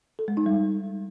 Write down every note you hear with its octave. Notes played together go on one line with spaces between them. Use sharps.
A4
G#3
D#4
G3